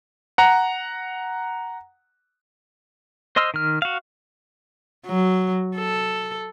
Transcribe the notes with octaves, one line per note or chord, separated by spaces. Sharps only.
F#5 A#5
C5 D#5 C6 E6 F6
D#3 F6
F#4 F5
F#3
A4